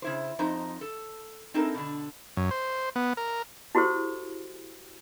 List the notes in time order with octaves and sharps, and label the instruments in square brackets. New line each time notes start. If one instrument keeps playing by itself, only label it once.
[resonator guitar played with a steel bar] C#3 E4 C5
F2 D#4 C5 A#5
A4
C4 D#4 E4 A4 A#4
B2 D3
[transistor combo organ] F#2
C5
B3
A#4
[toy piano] E4 F#4 G4 A4 C5